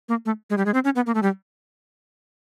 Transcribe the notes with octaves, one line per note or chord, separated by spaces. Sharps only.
A#3
A3
G#3
G3
G#3
C4
C#4
B3
A#3
A3
G3